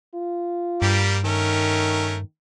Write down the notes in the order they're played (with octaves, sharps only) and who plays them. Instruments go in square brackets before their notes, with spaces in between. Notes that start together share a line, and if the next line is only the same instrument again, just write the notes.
[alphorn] F4
[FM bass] G2 [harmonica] G3 A#3 G4
[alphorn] D#3 [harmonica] A3 C#4 A#4